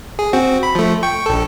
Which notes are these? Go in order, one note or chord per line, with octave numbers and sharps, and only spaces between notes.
G#4
C4 F#4
B5
F3 A3
G5 C#6
A#1 A4